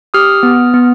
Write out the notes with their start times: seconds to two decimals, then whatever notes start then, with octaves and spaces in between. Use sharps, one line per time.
0.14 G4 D#6 F6
0.43 B3
0.74 B3